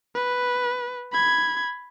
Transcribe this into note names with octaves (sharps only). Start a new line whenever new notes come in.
B4
B5 G#6